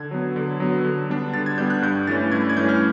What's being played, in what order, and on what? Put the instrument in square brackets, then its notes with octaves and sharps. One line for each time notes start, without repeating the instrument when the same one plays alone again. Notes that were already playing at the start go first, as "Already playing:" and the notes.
Already playing: [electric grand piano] D3 G#6
F#3 B3
D3
F#3 B3
D3
G3 B3 D4
D3 A6
G#6
G3 B3 D4 G6
F#6
G2 G6
E3 A3 C#4 A6
G2 G#6
G#6
E3 A3 C#4 G6
F6